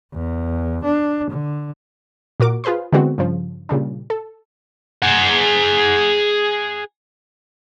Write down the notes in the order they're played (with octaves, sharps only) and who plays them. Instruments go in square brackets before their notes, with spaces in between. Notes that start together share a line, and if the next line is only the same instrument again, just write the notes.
[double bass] E2
D4
D3
[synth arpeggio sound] A#2 F#4 A#4 D6
F4 G#4 B4 C5 C6
D3 E3 G#3 B3 C4 F#4
G2 C#3 F3
A#2 C#3 G3 D4
A4
[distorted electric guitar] G#4 F#5